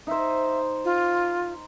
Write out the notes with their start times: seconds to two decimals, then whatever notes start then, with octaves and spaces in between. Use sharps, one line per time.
0.07 D#4 C5 E5
0.85 F4